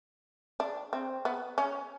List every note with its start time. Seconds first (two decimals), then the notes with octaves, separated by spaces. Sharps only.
0.60 D4
0.93 C4
1.25 B3
1.58 C#4